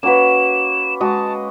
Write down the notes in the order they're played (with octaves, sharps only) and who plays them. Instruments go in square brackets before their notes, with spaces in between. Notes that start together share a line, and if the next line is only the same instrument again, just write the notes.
[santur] A#3 F#4 [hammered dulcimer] C#4 B4 [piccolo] E7
[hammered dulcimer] G#3 F#4 [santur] D#5 [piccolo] A5